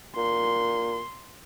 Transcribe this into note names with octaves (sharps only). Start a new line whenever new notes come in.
A#2 C6